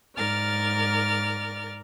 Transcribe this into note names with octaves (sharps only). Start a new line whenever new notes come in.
G#2 A#4 D5 F6 A6